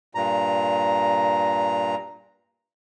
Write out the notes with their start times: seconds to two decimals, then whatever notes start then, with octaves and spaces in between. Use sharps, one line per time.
0.15 G2 A#2 A#5